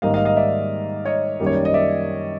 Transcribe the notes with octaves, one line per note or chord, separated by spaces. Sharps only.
G#2 D#3 G3 A#3 D#5 F5
D#5 F5
D#5 F5
D5 E5
C#5 D#5
F#2 D#3 G3 A#3
C#5
D5
D#5
D5 E5